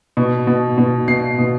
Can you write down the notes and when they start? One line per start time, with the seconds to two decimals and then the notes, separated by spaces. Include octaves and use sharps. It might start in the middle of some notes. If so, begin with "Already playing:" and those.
0.17 B2
0.47 B2
0.78 B2
1.08 B2 C7
1.39 B2